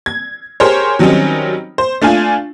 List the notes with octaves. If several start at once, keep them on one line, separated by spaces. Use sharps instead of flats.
G#6
G4 G#4 A#4 C5 C#5
D#3 F#3 G3 C4 C#4 D#4
C5
A3 D4 F4 G#5